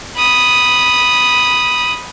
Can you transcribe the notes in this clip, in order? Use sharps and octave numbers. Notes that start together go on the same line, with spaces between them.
B5 D#6